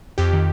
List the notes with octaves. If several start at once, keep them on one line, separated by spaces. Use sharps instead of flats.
F2 G4
D#3